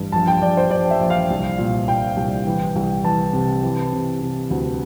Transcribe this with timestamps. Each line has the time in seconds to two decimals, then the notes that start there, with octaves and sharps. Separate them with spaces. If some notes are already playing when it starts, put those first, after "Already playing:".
Already playing: A1 G2
0.12 A#1 A5
0.27 G5
0.42 A#1 D5
0.57 C5
0.71 A#1 D5
0.91 E5
1.00 A#1
1.10 F5
1.30 C2
1.58 A#2
1.88 A#2 G5
2.17 C2
2.47 E3
2.75 C2
3.04 E3 A5
3.33 C3
3.63 E3
3.92 C3
4.21 C3
4.50 D2